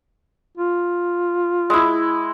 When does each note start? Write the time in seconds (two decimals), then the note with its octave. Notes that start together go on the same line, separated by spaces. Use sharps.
0.57 F4
1.70 G#3 E4